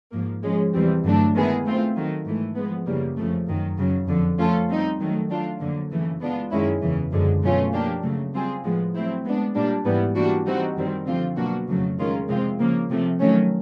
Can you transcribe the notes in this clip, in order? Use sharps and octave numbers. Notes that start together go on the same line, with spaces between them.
G#2 F3 A#3
F3 G#3 C#4
E2 C3 E3 G3 C4
G2 D3 F#3 A3 D4
D#3 G#3 B3 E4 G#4
A3 C4 F4
D#3 F#3 A3
G#2 E3 A3
F3 G#3 B3
F#2 C#3 E3 G3 A#3
F2 C#3 F3 A3
F#2 D#3 F#3
F#2 C#3 F#3
F2 D3 F3
F3 A3 C#4 F4 A4
G3 C4 D#4
D#3 F#3 A3
F#3 A3 D4 F4
F2 D3 F#3 A#3
F#2 C#3 E3 A3
G#3 B3 D4 F4
F#2 D#3 G#3 C#4 E4
E2 C#3 E3
F#2 D3 F3 G#3
B2 F#3 A3 C#4 F4
F3 A#3 D4 G4
C#3 F#3 A3
G3 C4 F4 G#4
A2 F3 G#3 B3
F#3 A3 C4 E4
G#3 B3 D4
A#2 G3 A#3 D4
G#2 E3 G3 B3
E3 G3 A#3 D4 F#4
E3 G3 C4 D#4 F#4
F#2 D#3 G3 C4
D3 F3 A3 C4 F4
B2 F#3 A#3 D4 F#4
F2 C#3 F#3 A3
D#3 G#3 C#4 F4 A#4
C3 F3 G#3 C4 F4
C#3 F3 A#3
C3 F3 A3
D#3 F#3 A3 C#4